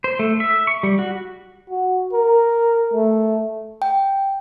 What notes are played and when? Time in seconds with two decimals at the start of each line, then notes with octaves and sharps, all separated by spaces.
0.04 C5
0.19 A3
0.40 E5
0.67 C#6
0.83 G3
0.99 F#4
1.70 F#4
2.13 A#4
2.94 A3
3.82 G5